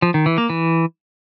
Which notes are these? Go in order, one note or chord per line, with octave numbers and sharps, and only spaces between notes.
F3
D#3
E3
A#3
E3